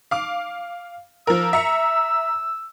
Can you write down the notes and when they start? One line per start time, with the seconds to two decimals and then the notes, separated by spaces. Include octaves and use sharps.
0.11 F5 D6
1.27 F3 A#4 E6
1.53 E5 A#5 C#7